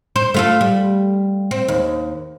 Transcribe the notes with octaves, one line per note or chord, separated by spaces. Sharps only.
C5
A3 F4 A4
G3
C4
D#2